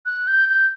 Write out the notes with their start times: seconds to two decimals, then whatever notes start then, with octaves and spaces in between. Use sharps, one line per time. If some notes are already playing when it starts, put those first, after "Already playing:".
0.06 F#6
0.27 G6
0.49 G6